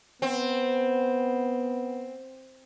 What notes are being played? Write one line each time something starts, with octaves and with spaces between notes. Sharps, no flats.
B3 C4